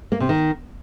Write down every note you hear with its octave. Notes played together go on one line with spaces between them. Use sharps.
A#3
C3
D#3